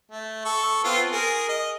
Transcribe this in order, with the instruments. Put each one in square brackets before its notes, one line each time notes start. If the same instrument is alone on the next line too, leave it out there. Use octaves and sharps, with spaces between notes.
[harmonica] A3
A4 C#6
B3 C4 F4
G#4 A#4
D#5